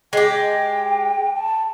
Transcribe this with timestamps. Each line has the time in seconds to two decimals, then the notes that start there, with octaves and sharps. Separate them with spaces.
0.13 G#3 G4 G5
1.35 A5